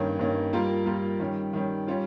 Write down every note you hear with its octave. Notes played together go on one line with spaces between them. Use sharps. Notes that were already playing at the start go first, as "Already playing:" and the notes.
Already playing: G2 D#3 A#3 C#4
G2 D#3 A#3 C#4
G3 A#3 F4 A#4
G3 A#3 F4 A#4
D#3 G3 C#4
D#3 G3 C#4
G3 C#4 F4